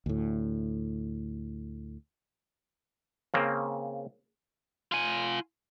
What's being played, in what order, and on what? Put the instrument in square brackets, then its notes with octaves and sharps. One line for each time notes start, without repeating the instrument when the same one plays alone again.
[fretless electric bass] D2 A2
[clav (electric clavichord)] C#3 A#3 C4
[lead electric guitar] F4 G#5